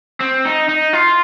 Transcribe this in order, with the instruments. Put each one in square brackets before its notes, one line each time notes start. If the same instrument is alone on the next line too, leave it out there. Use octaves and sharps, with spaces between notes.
[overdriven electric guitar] C4
D#4
D#4
F4